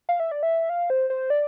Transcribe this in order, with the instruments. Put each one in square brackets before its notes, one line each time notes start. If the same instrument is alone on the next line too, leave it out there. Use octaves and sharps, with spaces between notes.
[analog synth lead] F5
E5
D5
E5
F5
C5
C5
D5